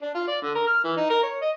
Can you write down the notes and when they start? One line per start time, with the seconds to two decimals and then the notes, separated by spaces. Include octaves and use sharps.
0.02 D4
0.15 F4
0.28 D5
0.42 D3
0.55 A#4
0.67 F6
0.84 E3
0.97 D#4
1.10 A#4
1.23 C#5
1.42 D#5